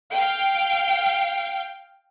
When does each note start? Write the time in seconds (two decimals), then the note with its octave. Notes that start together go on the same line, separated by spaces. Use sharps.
0.12 F5 G5